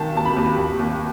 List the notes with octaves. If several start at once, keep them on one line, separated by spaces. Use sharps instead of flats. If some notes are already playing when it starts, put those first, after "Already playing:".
Already playing: B1 D#3 A5
D#2 A5
B5
D#2
D#2
D#2